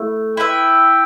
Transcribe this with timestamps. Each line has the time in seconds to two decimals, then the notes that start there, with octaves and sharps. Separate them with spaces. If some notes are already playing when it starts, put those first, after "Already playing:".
Already playing: A3 E4
0.37 E4 B4 E5 G5